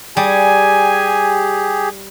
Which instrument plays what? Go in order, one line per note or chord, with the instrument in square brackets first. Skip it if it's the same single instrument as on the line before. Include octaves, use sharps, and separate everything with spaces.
[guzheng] G3 [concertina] G4 G#4 [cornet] G#5